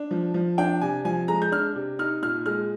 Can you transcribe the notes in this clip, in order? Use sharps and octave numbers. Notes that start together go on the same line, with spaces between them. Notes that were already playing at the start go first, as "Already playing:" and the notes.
Already playing: D4
F3
F3
D4 G5
C3 G#5
F3 G#5
G#3 A#5
G6
D4 F6
C3
D#4 F6
A#2 F6
G#3 F6